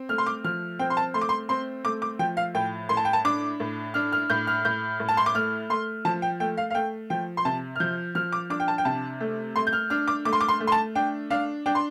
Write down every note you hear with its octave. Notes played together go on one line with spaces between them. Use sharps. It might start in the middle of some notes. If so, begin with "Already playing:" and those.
Already playing: C4
A3 F6
C6
D6
F3 F6
C4 G5
C6
A5
A3 C6
D6
C6
C4 C6
A3 D6
D6
F3 G5
F5
A2 G5
A2 C6
A5
G5
A5
D4 D6
A2
D4 F6
F6
A2 G6
F6
A2 G6
A2
A5
C6
D6
A3 F6
A3 C6
F3 A5
G5
A3 G5
F5
F5
A3 G5
F3 G5
C6
C3 A5
F6
F3 G6
F3 F6
D6
D4 D6
G5
A5
G5
C3 A5
A3
A3 C6
G6
F6
D4 F6
D6
A3 D6
C6
D6
C6
A3
C6
A5
D4 G5
D4 F5
D4 G5
C6